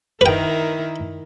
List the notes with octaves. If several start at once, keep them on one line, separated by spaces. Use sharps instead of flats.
D#3 E4 A#4 B4 G5